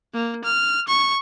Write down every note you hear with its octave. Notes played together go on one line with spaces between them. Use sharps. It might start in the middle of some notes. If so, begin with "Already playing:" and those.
A#3
F6
C#6